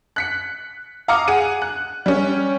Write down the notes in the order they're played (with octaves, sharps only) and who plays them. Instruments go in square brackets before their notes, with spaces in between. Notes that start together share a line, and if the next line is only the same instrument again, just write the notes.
[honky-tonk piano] F#6 B6 C#7
F5 A#5 D6 D#6 F6 C#7
G#4 F#5 D#7
F#6
G3 C#4